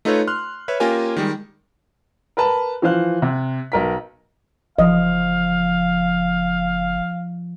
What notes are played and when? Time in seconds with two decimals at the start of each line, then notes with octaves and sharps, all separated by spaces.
0.05 A3 D#4 F4 A4 B4 C#5
0.28 C6 F6 F#6
0.68 B4 C#5 E5
0.80 A#3 C#4 F4 G4 A#4 G#5
1.16 D#3 G3 G#3
2.37 A#4 B4 A5 B5
2.82 E3 F3 C5 F5 F#6
3.22 C3
3.72 B1 A#4 B6
4.79 F#1 F3 D#5 F5